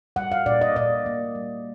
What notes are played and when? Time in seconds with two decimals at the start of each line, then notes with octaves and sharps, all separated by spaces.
0.16 G3 F#5
0.32 F5
0.46 A#2 D5
0.61 D#5
0.76 A#2 D5
1.06 A#3
1.35 G3